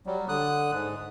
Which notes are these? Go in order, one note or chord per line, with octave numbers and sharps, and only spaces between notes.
F#3 G3
D3 D#6 F#6
G#2